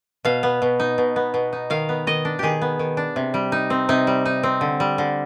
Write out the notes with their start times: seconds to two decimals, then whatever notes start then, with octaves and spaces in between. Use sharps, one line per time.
0.25 B2 F5
0.43 B3
0.62 B2
0.80 D#4
0.98 B2
1.16 B3
1.34 B2
1.53 D#4
1.70 D#3 F5
1.89 B3
2.07 D#3 D#5
2.25 D4
2.39 D#3 G4 G#4
2.62 B3
2.79 D#3
2.97 D4
3.16 C3
3.34 G3
3.52 D#4
3.70 C4
3.89 C3 D#4
4.07 G3
4.26 D#4
4.43 C4
4.61 D3
4.80 G3
4.98 D3